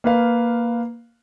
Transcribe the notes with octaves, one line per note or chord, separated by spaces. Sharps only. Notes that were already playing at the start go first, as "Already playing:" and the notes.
A#3 B4 F5